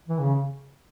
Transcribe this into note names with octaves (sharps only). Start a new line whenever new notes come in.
E3
C#3